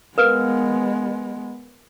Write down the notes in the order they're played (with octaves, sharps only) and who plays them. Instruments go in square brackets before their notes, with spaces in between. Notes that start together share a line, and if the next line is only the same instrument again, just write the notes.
[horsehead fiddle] G#3 B3 [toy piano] A#4 B4 F5